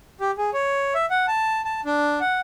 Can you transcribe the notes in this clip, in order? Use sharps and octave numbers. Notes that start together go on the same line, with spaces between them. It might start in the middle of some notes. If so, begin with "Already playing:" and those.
G4
G#4
C#5
E5
F#5
A5
A5
D4
F#5